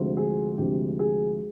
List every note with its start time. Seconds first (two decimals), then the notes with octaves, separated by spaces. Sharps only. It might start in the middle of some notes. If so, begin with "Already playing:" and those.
Already playing: D2 C3 F3 G#3
0.17 G#4
0.58 D2 C3 F3 G#3 G4
0.99 G#4